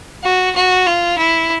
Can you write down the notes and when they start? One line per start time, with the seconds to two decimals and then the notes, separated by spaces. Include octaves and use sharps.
0.23 F#4
0.55 F#4
0.86 F4
1.18 E4